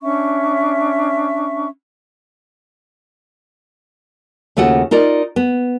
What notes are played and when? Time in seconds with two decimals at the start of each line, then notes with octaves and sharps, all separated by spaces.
0.02 C#4 D4 E5 C#6
4.57 D#2 C#3 A3 F4 F#4 F#5
4.91 D#4 F4 A#4 D5 D#5
5.36 B3